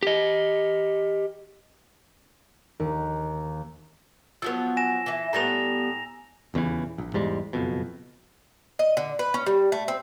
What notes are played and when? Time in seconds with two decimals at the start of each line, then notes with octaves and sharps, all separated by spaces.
0.03 G4 D#5
2.80 D#2
4.42 F3 F#3 B3 E6
4.77 G#5 A#6 E7
5.06 E3 E4
5.33 A2 G3 B3 A#5 A#6 F7
6.54 D#1 E2 C#3 E3
6.98 A#1
7.13 E2 G#2 G3 G#3
7.53 F#1 F2 B2
8.79 D#5
8.97 D3
9.19 B4
9.34 C#4
9.46 G3
9.72 A3
9.88 C4